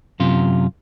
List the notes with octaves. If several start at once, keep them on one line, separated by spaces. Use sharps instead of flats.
F#2 C3 F4